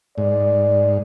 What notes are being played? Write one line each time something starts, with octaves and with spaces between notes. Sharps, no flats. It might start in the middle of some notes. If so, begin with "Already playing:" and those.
G#2 D5